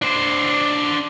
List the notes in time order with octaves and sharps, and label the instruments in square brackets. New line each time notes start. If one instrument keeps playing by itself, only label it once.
[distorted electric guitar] D4 C5